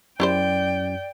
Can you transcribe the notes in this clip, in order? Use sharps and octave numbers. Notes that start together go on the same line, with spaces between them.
F#2 E4 G4 C5 D5 G5